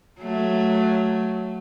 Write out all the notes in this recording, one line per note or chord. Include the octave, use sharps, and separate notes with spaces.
F#3 A3